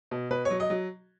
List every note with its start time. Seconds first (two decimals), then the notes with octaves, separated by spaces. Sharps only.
0.11 B2
0.30 B2 B4
0.45 F#3 C#5
0.60 D#5
0.70 F#3